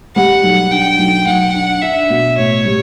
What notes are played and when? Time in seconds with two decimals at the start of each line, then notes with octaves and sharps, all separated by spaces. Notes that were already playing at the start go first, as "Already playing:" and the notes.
0.16 G3 F#5
0.43 B1
0.71 D4 G5
0.99 B1
1.27 B1 F#5
1.54 D4
1.82 D4 E5
2.10 B2
2.37 A2 C#5
2.65 G3